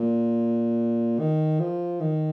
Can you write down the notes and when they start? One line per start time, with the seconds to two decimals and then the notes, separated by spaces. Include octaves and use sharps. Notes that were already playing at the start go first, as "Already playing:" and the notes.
Already playing: A#2
1.20 D#3
1.60 F3
2.01 D#3